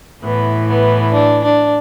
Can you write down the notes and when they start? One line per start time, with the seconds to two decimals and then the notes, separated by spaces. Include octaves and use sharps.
0.23 A2 E3 B3
0.68 B3
1.14 D4
1.45 D4